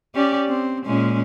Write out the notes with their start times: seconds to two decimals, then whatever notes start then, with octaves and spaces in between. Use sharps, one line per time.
0.15 C#4 G4 D5
0.49 C4
0.86 A#2 G#3 C#4